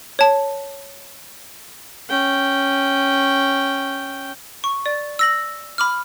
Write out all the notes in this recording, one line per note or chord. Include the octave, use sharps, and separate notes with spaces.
C#5 A5
C#4 G5
C#6
D5
E6 A#6 F#7
B5 D6 F6